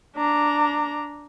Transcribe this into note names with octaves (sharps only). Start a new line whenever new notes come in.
D4 A#5